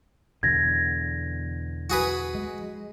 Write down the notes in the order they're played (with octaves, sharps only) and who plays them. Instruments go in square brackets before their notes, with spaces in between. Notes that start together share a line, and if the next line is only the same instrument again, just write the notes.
[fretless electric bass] E2 B2 D3 [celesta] G#6 A#6
[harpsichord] F#4 G#4 B4
[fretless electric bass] G#3